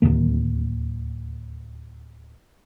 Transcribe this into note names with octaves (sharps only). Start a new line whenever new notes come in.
D1 G1 D#2 A#3